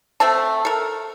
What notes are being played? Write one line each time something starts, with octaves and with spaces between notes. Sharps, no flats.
A3 C4 A4 A5
A4 A#4